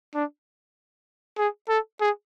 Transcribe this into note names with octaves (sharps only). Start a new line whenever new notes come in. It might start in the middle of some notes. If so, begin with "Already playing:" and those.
D4
G#4
A4
G#4